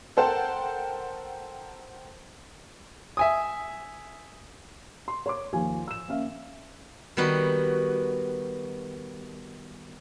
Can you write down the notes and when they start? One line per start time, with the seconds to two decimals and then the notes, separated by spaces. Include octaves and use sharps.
0.17 A4 A#4 C5 F#5 G5 A5
3.17 E5 G#5 D#6
5.08 C6
5.26 C#5 C6 D6
5.53 D#2 F3 F4 G#5
5.88 E6 E7
6.08 A#3 C#4 E5 F5
7.17 D#3 G3 B3 F#4